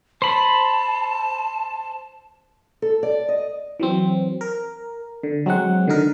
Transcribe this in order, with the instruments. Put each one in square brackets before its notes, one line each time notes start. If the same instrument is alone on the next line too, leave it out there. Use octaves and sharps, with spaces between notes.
[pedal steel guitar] C5 B5 [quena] A5
[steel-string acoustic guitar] A4
D5
D#5
[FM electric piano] E3 F#3 C4
A#4
D3
F#3 G#3 C4 F#5
D3 D#3 D#4 A#4